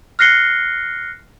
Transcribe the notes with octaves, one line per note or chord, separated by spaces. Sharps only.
F6 F#6 A#6 C7 C#7 G7